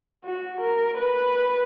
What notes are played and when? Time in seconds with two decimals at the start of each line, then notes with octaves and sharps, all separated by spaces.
0.25 F#4
0.61 A#4
0.98 B4